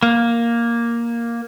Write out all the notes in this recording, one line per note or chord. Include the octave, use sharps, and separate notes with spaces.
A#3